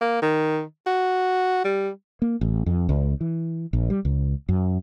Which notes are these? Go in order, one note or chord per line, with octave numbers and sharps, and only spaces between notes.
A#3
D#3
F#4
G3
A#3
A1
F2
C#2
E3
A#1
G3
C#2
F#2